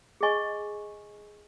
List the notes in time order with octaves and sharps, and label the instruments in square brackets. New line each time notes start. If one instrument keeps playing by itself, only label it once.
[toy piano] G#4 D#5 G#5 C#6